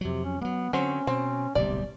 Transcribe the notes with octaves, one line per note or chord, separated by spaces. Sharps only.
F2 C3 F#3
C#4
F#3 G#3 B3
D3 F#3 C4 C#4
B2 C4
D1 B1 C3 G3 D5